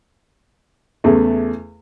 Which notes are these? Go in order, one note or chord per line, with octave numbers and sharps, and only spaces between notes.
E2 C#3 A3